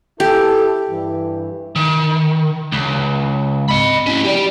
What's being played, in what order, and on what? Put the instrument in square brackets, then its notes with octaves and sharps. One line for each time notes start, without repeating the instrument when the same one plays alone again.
[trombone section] E4 A4 [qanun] G4
[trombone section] G2 E3
[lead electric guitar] D#3
C#2
D#5 B5
C#4 E4
G4 D5